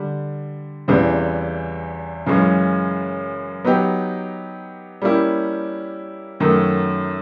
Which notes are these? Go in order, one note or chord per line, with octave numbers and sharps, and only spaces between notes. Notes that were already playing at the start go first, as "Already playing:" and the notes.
Already playing: D3 G3
E2 C#3 E3 G3 C4
F#2 C#3 E3 G#3 C#4
F#3 B3 D#4 G4
G3 A#3 C#4 E4 G4
F#2 D#3 F#3 A3